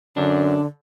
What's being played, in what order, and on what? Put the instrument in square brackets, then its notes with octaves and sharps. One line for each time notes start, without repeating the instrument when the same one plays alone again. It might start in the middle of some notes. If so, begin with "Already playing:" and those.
[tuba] F#2 [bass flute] D3 [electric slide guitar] D4